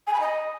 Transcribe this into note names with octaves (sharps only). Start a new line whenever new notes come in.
G#5
B5
D#5